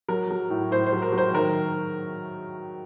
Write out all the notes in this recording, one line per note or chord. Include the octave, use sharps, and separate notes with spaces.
F#3 A#4
F#3
A2
A2 C5
C5
F#3
A#4
F#3
C5
D#3 A#4